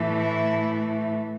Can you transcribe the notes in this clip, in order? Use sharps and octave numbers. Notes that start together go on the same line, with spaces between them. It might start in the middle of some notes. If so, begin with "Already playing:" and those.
Already playing: A2 E3 A3
E4